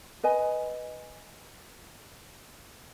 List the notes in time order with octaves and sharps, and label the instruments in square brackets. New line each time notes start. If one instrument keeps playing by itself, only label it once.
[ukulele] B4 D#5 G#5